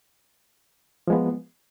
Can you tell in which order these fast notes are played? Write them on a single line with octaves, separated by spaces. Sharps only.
F3 G#3 B3